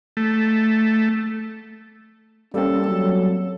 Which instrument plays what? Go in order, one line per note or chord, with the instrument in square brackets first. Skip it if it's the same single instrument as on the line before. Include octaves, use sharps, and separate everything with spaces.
[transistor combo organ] A3
[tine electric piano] G3 A#3 C4 [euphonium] C#4 [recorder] A4
[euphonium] F#3